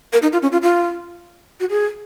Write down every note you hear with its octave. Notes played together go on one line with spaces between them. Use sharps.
A#4
D#4
F4
C#4
F4
F4
F#4
G#4